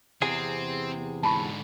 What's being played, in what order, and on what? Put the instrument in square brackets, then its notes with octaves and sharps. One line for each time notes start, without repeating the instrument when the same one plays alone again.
[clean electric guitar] E2 C3 G#4 [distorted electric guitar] C4
[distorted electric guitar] G#2 D3 [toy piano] A5 B5 C#6